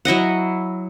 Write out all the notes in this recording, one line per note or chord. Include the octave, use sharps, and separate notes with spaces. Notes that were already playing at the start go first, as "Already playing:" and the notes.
F#3 E4 D#5 F#5